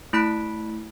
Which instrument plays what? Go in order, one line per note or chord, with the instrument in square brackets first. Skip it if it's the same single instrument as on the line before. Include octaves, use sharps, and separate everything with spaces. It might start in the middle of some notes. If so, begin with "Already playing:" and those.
[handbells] A3 E4 B5 F#6 B6 D7